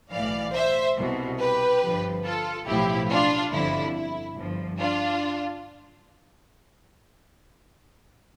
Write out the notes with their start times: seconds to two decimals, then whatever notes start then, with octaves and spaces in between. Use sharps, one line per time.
0.12 B1 A2 E3 D5 F5
0.55 C5 E5
0.97 C2 B2
1.40 G4 B4
1.83 G1 G2 D3 F3
2.25 F4 A4
2.67 B1 A2 F3 E4 G4
3.10 D4 F4
3.53 G1 F2 D3 E4
3.95 E4
4.37 G1 G2 F3
4.79 D4 F4